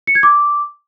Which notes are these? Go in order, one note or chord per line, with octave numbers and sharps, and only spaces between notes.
C#7
G#6
D6